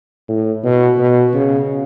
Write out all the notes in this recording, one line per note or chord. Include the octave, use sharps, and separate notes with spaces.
A2
B2
B2
C#3